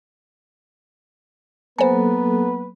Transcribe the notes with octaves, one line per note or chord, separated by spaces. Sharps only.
F#3 A#3 B3 A4 B4 C5 G#5